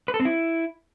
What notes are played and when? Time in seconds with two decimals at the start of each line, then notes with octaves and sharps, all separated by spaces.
0.08 B4
0.14 A4
0.20 C4
0.25 E4